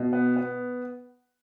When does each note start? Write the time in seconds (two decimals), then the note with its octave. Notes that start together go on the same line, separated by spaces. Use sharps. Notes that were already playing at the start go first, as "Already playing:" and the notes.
Already playing: B2
0.13 B3
0.36 B3